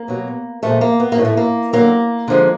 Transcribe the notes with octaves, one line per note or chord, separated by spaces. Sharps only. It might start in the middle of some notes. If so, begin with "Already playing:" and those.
Already playing: A#3
B2 F#3
A#2 F3 G#3 A3
A#3
B3
A#3
A2 E3 G#3
A3
A#3
D3 F#3 A#3
D3 F3 G#3